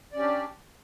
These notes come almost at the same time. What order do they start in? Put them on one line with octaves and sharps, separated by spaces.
D5 C#4 G4 D4